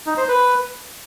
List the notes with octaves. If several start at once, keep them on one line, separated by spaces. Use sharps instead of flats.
D#4
C5
B4